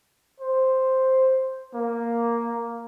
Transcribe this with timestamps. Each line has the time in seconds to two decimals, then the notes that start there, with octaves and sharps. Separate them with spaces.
0.40 C5
1.74 A#3